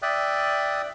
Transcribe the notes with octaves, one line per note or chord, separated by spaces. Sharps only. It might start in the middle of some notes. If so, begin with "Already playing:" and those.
D5 E5 G5 D#6 F#6